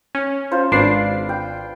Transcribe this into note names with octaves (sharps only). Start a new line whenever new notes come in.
C#4
F4 C5
G#1 D4 B4 C7
G5